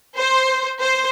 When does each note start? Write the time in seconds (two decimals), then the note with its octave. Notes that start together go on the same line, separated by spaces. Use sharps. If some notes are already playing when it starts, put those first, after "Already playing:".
0.17 C5
0.80 C5